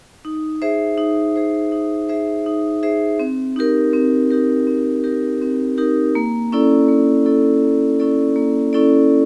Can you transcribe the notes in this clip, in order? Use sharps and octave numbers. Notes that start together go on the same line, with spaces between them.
D#4
G#4 C5 E5
D#4
G#4 C5 E5
D#4
G#4 C5 E5
D#4
G#4 C5 E5
C4
D#4 G4 A#4
C4
D#4 G4 A#4
C4
D#4 G4 A#4
C4
D#4 G4 A#4
A#3
C#4 E4 A4 D5
A#3
C#4 E4 A4 D5
A#3
C#4 E4 A4 D5
A#3
C#4 E4 A4 D5